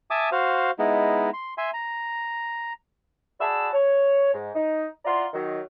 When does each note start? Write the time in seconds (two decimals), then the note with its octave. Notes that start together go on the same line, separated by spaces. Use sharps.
0.10 E5 G#5 A5 D6 D#6
0.32 F#4 C5 F5
0.79 G#3 B3 D#4 E4
1.33 C6
1.58 E5 G#5 C6
1.74 A#5
3.40 F#4 G#4 D5 A5 B5 E6
3.73 C#5
4.33 G#2
4.54 D#4
5.05 E4 F4 D5 F#5 A#5 C6
5.33 D#3 F#3